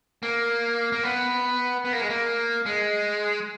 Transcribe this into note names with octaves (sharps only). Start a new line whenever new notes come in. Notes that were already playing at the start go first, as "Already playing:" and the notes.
A#3
A#3
B3
B3
A#3
G#3
A#3
G#3